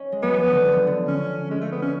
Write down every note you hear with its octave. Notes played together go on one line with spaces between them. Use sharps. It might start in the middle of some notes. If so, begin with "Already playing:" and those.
Already playing: C#4
G#3
F#3 B3
F3
D3
F3
D3
C#4
G#3
A3
B3
C#4